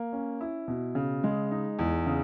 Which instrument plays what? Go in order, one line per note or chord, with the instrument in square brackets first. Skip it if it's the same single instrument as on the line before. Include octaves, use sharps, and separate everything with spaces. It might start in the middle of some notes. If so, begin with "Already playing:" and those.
Already playing: [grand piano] A#3
C#4
E4
B2
C#3
G#3
D#4
E2
C#3